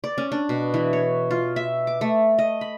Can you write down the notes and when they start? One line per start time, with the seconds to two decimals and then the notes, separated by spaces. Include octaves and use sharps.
0.04 D5
0.18 C#4
0.32 D4
0.49 B2
0.74 E3
0.93 C#5
1.31 F4
1.56 E5
1.87 D6
2.01 A3
2.39 D#5
2.61 B5